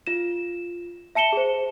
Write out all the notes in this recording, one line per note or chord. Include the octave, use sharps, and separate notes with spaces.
F4 E7
E5 A5 C#7 E7 G7
G#4 C5